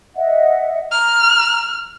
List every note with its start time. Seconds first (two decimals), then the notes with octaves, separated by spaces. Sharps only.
0.16 D#5 E5 F#5
0.92 A#5 F6